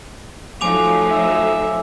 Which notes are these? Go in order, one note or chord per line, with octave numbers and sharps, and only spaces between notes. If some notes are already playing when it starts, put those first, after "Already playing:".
F3 F#3 A3 D#4 G#5 D6 F7
E5